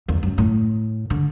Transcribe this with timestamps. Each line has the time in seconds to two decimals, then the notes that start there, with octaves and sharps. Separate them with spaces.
0.08 E2
0.23 F#2
0.38 A2
1.10 D3